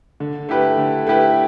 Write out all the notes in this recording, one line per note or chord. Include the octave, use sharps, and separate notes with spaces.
D3
A3 E4 G4 B4
D3
A3 E4 G4 B4